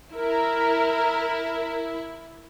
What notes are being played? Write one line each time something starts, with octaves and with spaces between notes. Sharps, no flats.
E4 A#4